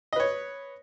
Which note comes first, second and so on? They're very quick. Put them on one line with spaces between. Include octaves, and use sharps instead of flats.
D#5 B4 C#5